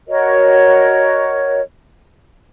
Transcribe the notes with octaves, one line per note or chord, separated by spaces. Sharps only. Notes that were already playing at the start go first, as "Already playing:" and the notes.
F#4 A#4 C#5 D#5